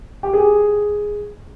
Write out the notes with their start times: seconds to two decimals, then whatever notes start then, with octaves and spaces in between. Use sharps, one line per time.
0.23 G4
0.33 G#4